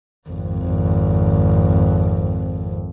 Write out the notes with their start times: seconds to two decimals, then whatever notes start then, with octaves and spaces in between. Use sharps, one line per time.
0.30 G#1 F2